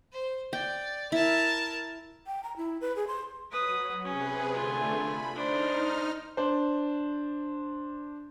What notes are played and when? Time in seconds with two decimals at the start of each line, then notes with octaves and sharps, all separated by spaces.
0.12 C5
0.53 D5 G5
1.12 E4 A#4 A5
2.27 G5
2.44 A#5
2.57 E4
2.81 B4
2.96 G#4
3.08 C6
3.51 F#3 B4 D#6
4.04 C3 C#4 G#4 B4
4.53 D3 A3 F4 G#5
4.95 B5
5.35 D4 D#4 C5 F6
6.37 D4 C5